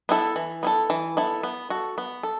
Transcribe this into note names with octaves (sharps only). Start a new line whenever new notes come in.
B3 E4 A4
E3
B3 E4 A4
E3
B3 E4 A4
B3
F#4 A4
B3
A4